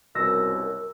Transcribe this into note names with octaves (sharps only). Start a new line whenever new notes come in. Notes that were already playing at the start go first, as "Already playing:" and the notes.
C2 F#2 B2 A#4 E6 A#6